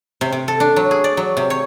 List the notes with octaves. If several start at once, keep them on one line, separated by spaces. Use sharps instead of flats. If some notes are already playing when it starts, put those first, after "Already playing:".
C3
C3
A4
D4
F#3
G#4
D5
F#3
C3
C#5